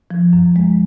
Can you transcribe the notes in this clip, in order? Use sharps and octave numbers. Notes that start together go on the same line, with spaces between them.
F3
F#2
G#3